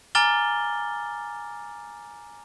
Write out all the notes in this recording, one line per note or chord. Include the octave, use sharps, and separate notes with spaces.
G#5 A#5 D6 F6 A6 G7